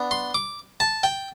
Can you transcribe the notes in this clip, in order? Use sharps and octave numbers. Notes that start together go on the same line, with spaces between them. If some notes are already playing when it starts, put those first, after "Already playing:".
Already playing: B3 D4
C6
D6
A5
G5